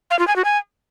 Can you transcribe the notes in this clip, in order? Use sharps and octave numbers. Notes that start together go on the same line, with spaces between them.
F5
F4
G#5
F#4
G#5